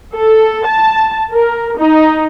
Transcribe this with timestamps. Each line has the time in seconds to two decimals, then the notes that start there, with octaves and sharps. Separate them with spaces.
0.15 A4
0.65 A5
1.32 A#4
1.79 D#4